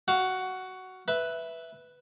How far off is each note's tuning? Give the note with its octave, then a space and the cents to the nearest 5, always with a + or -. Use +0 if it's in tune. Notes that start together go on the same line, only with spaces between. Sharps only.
F#4 +10 F5 +0
B4 +0 E5 +0